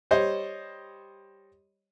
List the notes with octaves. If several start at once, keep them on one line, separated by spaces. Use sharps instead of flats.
G3 C5 C#5 D#5